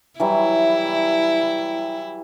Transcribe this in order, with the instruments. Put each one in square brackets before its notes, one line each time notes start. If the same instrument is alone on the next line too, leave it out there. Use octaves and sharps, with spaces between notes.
[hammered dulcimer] E3 F#3 G3 [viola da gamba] E4